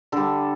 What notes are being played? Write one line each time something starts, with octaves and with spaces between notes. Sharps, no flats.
D3 G3 A4